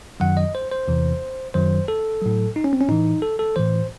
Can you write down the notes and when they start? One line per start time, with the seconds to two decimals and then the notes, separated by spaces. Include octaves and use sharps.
0.20 F#2 D#3 F#3 F#5
0.37 D#5
0.55 C5
0.71 C5
0.88 E2 C3 E3
1.54 F#2 D#3 F#3 C5
1.88 A4
2.22 A2 F#3
2.56 D#4
2.64 C#4
2.73 C4
2.81 C#4
2.89 A2 E3 D#4
3.22 A4
3.39 A4
3.56 A2 E3 C5